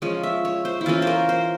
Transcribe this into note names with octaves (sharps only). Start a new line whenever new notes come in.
F3 G#3 C#4 C#5
E5
C#5
C5
E4
E3 A#3 C#4 F4
A#4 C5
C5